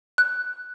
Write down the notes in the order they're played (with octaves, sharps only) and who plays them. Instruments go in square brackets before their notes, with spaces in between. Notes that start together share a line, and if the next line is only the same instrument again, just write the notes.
[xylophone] F#6